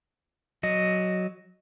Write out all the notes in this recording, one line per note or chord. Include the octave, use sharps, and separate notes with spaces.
F#3 D#5